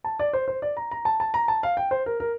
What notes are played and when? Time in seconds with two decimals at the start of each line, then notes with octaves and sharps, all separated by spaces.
0.04 A5
0.19 D5
0.33 C5
0.48 C5
0.62 D5
0.77 A#5
0.91 A#5
1.05 A5
1.20 A5
1.34 A#5
1.48 A5
1.63 F5
1.77 G5
1.91 C5
2.06 A#4
2.20 A#4